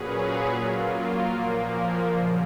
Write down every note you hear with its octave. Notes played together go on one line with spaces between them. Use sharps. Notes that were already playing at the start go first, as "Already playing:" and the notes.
Already playing: A#2 F#3 C#4 G#4 B4
F#3 A#3 F4
A#2 F3 A#3
F#2 C#3 F3